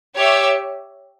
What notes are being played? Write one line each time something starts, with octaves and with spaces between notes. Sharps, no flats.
G4 C#5 E5